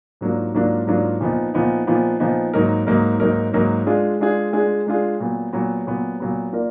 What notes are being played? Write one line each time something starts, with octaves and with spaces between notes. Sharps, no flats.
G#2 F#3 A#3 D4 F4
G#2 F#3 A#3 D4 F4
G#2 F#3 A#3 D4 F4
A#2 F3 B3 D#4
A#2 F3 B3 D#4
A#2 F3 B3 D#4
A#2 F3 B3 D#4
G#2 F#3 A#3 D#4 A#4
G#2 F#3 A#3 D#4 A#4
G#2 F#3 A#3 D#4 A#4
G#2 F#3 A#3 D#4 A#4
G#3 D4 F4 G#4
G#3 D4 F4 G#4
G#3 D4 F4 G#4
G#3 D4 F4 G#4
A#2 F#3 B3
A#2 F#3 B3
A#2 F#3 B3
A#2 F#3 B3
A#3 F4 A#4 D5